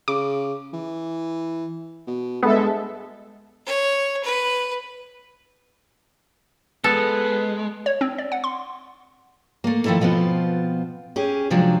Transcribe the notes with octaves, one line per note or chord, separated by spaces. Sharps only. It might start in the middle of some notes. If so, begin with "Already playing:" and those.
C#3 D6
E3
B2
G2 G#3 B3 A4 E5
C#5
B4
G#3 B3 A4
C#5
C4
D5
F#5
C6
A3 A#3
D#3 F3 A3 E4 A4 A#4
B2 F3 B3 C4 F4
C#4 G4 G#4
C3 F3 F#3 G#3 D4